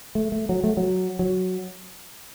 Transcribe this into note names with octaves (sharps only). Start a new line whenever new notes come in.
A3
A3
F#3
A3
F#3
F#3